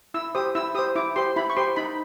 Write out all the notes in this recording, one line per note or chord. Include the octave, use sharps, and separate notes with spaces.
E4 E6
G4 C5 D#6
E4 E6
G4 C5 D#6
E4 D6
G4 C5 C6
E4 B5
C#6
G4 C5 C6
D#4 B5